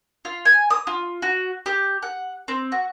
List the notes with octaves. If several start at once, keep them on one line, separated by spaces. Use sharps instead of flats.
F4
G#5
D#6
F4
F#4
G4
F#5
C4
F#4